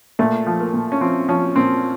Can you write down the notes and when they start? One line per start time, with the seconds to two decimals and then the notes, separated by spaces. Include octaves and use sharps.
0.19 A#2 A3
0.47 F3
0.60 A#3
0.73 A#2
0.92 C#4
1.01 F3 C4
1.28 F3 C#4
1.56 A#2 C4